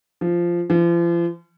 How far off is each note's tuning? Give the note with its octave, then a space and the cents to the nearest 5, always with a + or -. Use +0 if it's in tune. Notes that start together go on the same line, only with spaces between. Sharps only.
F3 -10
F3 -40